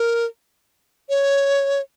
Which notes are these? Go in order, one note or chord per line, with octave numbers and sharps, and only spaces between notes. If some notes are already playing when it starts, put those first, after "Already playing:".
Already playing: A#4
C#5